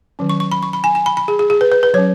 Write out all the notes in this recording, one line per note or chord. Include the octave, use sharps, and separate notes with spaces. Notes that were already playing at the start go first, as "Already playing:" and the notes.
D#3 F#3 C#4
C#6
C#6
B5
C#6
B5
G#5
G#5
B5
B5
G#4
G#4
G#4
B4
B4
B4
F#3 C#4 C#5